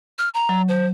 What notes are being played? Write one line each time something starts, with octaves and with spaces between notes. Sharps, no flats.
F6
A#5
F#3
C5